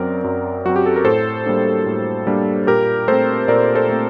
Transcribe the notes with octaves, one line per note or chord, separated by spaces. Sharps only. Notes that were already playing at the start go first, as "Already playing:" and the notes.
Already playing: F#2 F#3 C4 A#4 D5
F#2
F#3 C4 F#4
G4
A4
A#4
A2 A4 C5
G3 A#3 D4
A2
G3 A#3 D4
A#2 G4 A#4
A3 C4 A4 C5
A#2 A#4 D5
A4 C5
A3 C4